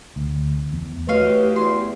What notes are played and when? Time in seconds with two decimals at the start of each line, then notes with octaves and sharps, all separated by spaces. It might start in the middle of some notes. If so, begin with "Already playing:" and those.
0.16 D2
0.73 E2
1.08 A3 E4 F#4 G4 B4 C#5 D#5 F5
1.56 E2 C6